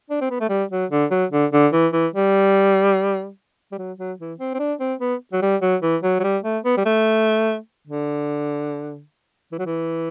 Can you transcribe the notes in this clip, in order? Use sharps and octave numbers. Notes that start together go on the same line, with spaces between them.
D4
C4
B3
A3
G3
F#3
D3
F#3
D3
D3
E3
E3
G3
G3
F#3
F#3
E3
C4
C4
D4
C4
B3
F#3
G3
F#3
E3
F#3
F#3
G3
A3
B3
G3
A3
D3
E3
F#3
E3